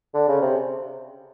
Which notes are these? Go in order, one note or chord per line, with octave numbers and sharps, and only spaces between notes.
D3
C#3
C3